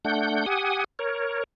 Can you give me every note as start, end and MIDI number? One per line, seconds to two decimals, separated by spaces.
0.05 0.46 57
0.05 0.46 62
0.05 0.46 78
0.05 0.46 91
0.46 0.84 67
0.46 0.84 78
0.46 0.84 80
0.46 0.84 87
0.99 1.44 70
0.99 1.44 73